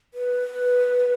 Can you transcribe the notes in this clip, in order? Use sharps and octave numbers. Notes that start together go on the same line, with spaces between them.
B4